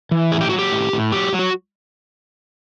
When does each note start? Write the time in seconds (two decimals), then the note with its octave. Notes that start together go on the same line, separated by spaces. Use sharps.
0.11 E3
0.32 A2 G#4
0.41 G4
0.49 F#3 F#4
0.59 G4
0.72 A2
0.93 A2
1.12 F#3 G4
1.33 F#3
1.39 F#4